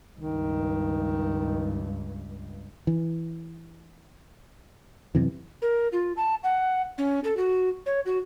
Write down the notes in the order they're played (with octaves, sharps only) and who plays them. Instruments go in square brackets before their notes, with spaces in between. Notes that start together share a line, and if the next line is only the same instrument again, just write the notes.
[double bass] C#2 G2 [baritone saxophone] D#3
[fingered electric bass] E3
F#2 C3 E3
[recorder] A#4
F4
A5
F#5
C#4
A4
F#4
C#5
F#4